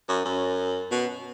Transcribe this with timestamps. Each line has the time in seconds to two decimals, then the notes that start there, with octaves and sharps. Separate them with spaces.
0.09 F#2
0.25 F#2
0.91 B2